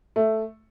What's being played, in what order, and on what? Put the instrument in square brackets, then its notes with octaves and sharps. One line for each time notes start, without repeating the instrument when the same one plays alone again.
[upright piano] A3